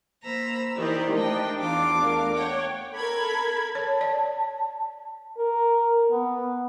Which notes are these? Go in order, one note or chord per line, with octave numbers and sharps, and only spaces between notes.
A#3 C5 A#5 B5 E6
D#3 E3 D#4 G4 A#4 C5 D5
A3 D4 D#4 C5 D#5 G5
E2 F4 F5 D6
A3 A#4
C#5 F#5 G5
A4 A#4 B5 G#6
C#5 A5
D5
A#4
B3